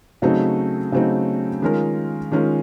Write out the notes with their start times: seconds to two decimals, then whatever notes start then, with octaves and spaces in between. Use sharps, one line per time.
0.22 C#3 F#3 A3 C4 D#4
0.92 C#3 F#3 A3 C4 D#4
1.62 D#3 G#3 C#4 F4 A#4
2.32 D#3 G#3 C#4 F4 A#4